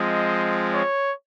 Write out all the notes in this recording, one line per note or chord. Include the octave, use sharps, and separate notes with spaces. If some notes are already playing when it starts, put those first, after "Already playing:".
Already playing: F3 G#3 C4 D#5
C#5